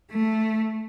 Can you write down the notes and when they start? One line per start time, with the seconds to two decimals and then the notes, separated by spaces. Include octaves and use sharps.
0.11 A3